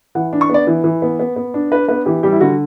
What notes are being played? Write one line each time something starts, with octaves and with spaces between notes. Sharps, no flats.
E3 F#5
D4
C#6
B3 D5
E3
E3
B3
B3
B3
D4
D4 B4
B3 B4
E3 G4
G3 G4
E4
D3 F#4